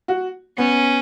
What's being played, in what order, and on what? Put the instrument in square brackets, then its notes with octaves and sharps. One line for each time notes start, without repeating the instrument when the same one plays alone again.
[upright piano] F#4
[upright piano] B3 [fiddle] C#4